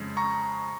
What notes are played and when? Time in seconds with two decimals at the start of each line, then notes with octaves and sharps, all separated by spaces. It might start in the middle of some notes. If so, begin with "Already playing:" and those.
Already playing: F2 C#3 G#3
0.17 A#5 C#6